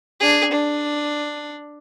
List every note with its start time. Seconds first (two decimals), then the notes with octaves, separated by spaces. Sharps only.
0.20 D4 G#4
0.51 D4